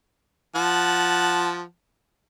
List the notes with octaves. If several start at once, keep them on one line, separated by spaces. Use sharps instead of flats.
F3 F#5 A5